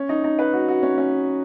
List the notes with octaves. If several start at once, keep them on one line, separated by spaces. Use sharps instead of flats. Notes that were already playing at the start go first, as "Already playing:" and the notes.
Already playing: C#4
D#4
D#4
B4
F#4
F#4
C#4
C#4